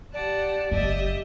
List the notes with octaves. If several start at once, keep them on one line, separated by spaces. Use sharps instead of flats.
G4 D5 F#5 A5
F#1 G4 D#5 E5